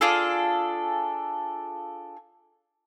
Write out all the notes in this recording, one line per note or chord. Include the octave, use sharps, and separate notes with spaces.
D4 F4 G#4 A4